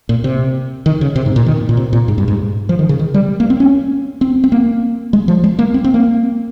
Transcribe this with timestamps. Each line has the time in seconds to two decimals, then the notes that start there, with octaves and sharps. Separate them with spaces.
0.09 A#2
0.24 C3
0.86 D#3
1.01 C#3
1.16 C3
1.26 G#2
1.36 A#2
1.46 D#3
1.69 A#2
1.77 C3
1.93 A#2
2.08 G#2
2.18 G2
2.28 G#2
2.69 F3
2.79 D#3
2.89 C#3
2.99 D#3
3.14 G3
3.40 A#3
3.50 C4
3.60 C#4
4.21 C4
4.44 C4
4.52 A#3
5.13 G#3
5.28 F3
5.44 G#3
5.59 A#3
5.74 C4
5.84 C4
5.94 A#3